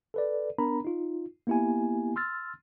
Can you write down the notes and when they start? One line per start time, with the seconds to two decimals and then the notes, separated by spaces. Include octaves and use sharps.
0.14 A4 B4 D5
0.58 B3 D4 A#4 A#5 B5
0.85 D#4 F4
1.47 A#3 B3 E4 G4 G#5
2.16 C6 E6 F6 A6